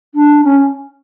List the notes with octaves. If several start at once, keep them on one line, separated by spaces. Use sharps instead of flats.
D4
C#4